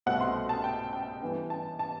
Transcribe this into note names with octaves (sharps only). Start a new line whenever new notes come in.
C2 B2 A3 C4 F#5
C6
A5
G5
G5
G2 E3 B3 D4 G5
A5
A5